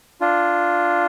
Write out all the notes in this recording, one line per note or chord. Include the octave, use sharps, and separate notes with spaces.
D4 F4